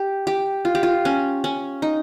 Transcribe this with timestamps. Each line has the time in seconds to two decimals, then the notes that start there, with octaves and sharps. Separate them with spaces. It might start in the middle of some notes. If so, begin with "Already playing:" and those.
Already playing: G4
0.27 G4
0.65 F4
0.75 G4
0.83 F4
1.05 C#4
1.44 C#4
1.82 D#4